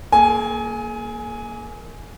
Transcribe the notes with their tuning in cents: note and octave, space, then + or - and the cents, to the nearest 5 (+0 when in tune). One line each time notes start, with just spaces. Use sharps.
A#3 +0 G#4 +40 G#5 +5